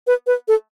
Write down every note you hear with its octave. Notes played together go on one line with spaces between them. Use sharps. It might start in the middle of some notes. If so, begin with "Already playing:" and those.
B4
B4
A4